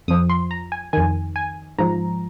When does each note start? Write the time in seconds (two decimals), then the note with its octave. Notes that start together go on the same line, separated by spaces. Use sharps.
0.08 F2 F3 D#6
0.30 C6
0.51 A#5
0.72 G#5
0.93 F2 D#3 G#5
1.36 G#5
1.78 G#2 F3 A#5